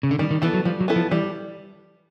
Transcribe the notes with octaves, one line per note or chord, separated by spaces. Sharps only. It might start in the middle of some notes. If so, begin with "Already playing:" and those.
C#3
D3
D#3 G3
D#3
E3 B3 E4 A4
F#3
F3 G3
F#3
B3 E4 A4
F3
E3 G3